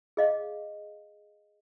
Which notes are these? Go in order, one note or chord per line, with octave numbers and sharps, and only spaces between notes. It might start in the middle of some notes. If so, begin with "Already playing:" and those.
G#4 D#5 F5